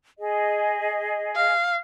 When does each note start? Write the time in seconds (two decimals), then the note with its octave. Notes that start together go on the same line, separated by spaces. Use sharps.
0.19 G#4 D#5
1.36 F5